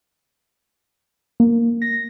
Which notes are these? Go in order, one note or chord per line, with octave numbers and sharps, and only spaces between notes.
A#3
A#6